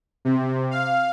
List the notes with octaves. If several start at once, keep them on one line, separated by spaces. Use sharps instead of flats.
C3
F5